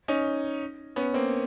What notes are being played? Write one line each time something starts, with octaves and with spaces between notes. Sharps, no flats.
C#4 D#4
B3 C#4
A#3 C4